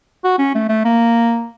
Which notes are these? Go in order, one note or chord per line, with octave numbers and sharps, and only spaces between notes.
F#4
C#4
A3
A3
A#3